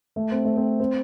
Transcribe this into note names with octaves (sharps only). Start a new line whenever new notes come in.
A3
C4
A3
C4
C4